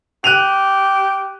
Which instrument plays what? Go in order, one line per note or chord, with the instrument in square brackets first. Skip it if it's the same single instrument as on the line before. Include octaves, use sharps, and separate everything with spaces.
[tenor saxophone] G4 [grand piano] F#6 D#7 F7